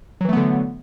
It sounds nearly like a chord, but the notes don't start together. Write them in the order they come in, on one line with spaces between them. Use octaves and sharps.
F#3 E3 A3 B3 D3